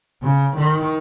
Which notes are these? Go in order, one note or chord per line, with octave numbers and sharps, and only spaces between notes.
C#3
D#3